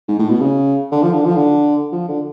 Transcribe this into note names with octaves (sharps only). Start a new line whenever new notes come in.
G#2
A2
B2
C#3
D3
F3
D3
F3
D3
F3
D3